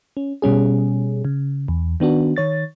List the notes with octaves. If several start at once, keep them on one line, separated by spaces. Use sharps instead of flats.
C#4
B2 G3 C#4 G#4
C#3
E2
D#3 B3 D4 F#4
D#3 C#5 A6